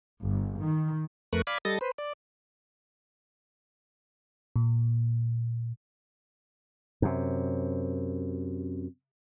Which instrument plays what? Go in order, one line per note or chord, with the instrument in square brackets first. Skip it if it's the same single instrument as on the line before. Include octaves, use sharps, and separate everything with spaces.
[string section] G1
D#3
[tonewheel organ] F2 A3 A#4 B4 C#6 F#6
D5 F5 G#5 B5
G3 A4 D#5 A6 A#6
B4 C5
D5
[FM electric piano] A#2
[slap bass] F#2 C3